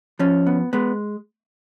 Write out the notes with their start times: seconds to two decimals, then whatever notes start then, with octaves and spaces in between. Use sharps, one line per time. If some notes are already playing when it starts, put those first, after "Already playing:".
0.19 F3 C#4
0.47 B3
0.73 G#3 B3